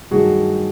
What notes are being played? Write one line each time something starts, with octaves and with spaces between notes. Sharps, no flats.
G2 D#3 F#3 A3 F#4 G#4